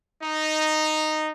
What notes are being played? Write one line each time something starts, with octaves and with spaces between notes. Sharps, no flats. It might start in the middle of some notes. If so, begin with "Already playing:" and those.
D#4